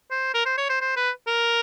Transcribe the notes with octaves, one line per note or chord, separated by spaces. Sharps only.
C5
A#4
C5
C#5
C5
C5
B4
A#4